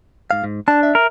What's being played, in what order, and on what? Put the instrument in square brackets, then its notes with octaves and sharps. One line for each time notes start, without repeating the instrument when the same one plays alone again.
[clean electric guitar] G#2 F5
G#2
[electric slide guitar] D4 [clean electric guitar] D5 A5
[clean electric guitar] E5
[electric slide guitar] A#4